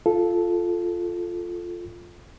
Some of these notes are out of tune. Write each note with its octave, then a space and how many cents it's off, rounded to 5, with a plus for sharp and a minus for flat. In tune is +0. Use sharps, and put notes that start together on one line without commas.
F4 +0 A4 -10